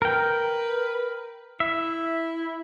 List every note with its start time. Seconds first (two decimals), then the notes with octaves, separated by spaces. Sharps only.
0.02 A#4 B4 G5
1.60 E4 E5